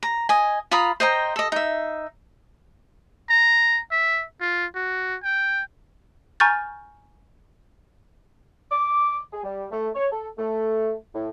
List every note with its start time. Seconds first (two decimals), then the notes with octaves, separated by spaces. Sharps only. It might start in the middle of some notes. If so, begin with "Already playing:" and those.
0.03 A#5
0.29 D#5 G#5
0.71 F4 A#5 B5 D#6
1.00 C5 D#5 G5 A#5
1.36 A4 D#5
1.52 D#4 E5
3.30 A#5
3.91 E5
4.41 F4
4.75 F#4
5.23 G5
6.40 G#5 A#5 C#6 F6 G6 A6
8.71 D6
9.32 G#4
9.44 G3
9.71 A3
9.95 C#5
10.11 A4
10.38 A3
11.14 A2